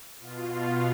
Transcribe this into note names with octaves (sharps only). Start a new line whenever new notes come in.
B2 F4